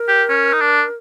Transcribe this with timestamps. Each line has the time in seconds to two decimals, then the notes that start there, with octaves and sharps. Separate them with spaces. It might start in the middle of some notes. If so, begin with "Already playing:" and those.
Already playing: A#4
0.08 G4
0.29 C#4
0.53 D#4
0.61 D4